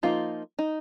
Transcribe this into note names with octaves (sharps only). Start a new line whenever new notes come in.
F3 A#3 D#4 F4
D#4